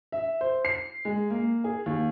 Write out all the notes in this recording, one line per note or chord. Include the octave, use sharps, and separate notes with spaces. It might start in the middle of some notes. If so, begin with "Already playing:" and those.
E5
C5
C7
G#3
A#3
G#4
D#2